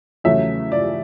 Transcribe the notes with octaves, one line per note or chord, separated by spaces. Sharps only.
E2 C#3 F#3 A3 C#4 E5
D5